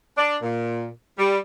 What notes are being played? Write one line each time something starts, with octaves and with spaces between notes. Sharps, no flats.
D4
A#2
G3